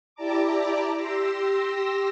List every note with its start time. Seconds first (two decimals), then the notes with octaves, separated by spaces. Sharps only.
0.15 E4 G4 D5 A5 A#5 D6
0.96 G4 C6 E6 A#6